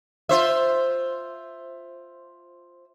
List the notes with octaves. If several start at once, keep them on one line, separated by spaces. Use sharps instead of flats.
F4 C5 E5